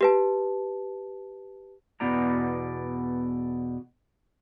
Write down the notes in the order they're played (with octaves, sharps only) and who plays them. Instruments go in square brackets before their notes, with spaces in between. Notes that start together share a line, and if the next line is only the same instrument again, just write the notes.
[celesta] G4 B4 A5
[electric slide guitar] E2 B2 B3 E4 D5 A#5